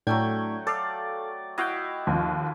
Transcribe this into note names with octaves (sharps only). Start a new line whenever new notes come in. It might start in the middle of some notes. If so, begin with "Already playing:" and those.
A2 F#3 A3 D4 G5 G#6
A4 D5 F5
E4 F#4 D#5 F5 G5
D#2 F3